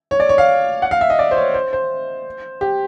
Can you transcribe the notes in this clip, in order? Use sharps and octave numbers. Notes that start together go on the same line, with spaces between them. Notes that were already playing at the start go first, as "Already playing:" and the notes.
C#5
D5
C#5
F5
F#5
F5
E5
D#5
D5
C5
C#5
C5
C5
G4